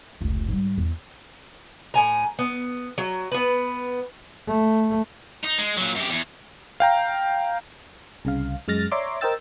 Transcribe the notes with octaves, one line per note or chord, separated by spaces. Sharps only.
F1 C#2
G#2 G3
E2
A2 G#5 A#5
B3
F#3
B3 B4
A3
D#4
G#3
A#2 F#3
F#2 G4
E2
F5 G5 A#5
C2 C#3 F5
F#2 G#3 F6 A6 A#6
C#5 D5 E5 A#5 C6 D6
A#4 C5 D#5 G5 E6 A6